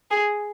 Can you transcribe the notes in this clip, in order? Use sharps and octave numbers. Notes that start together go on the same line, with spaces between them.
G#4